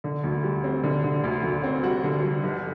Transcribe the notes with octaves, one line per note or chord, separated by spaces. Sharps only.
D3
D2
G3
C4
D3
D3
D2
D2
C4
G3 F#4 F#5
D3
G3
G1